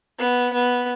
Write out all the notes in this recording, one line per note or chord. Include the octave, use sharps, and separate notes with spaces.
B3
B3